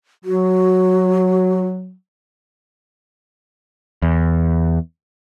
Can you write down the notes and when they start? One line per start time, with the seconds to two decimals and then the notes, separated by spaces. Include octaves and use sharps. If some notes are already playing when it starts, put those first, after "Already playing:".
0.25 F#3 F#4
4.02 E2